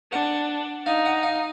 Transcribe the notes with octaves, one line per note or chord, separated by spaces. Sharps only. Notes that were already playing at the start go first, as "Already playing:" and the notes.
D4 F#5
D#4 F5
F#5
F5